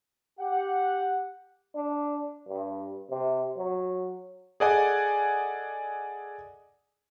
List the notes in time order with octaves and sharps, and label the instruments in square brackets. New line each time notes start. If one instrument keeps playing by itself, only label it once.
[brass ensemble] G4 F#5
[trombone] D4
G2
C3
F#3
[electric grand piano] G#4 A4 D5 D#5 F#5 G#5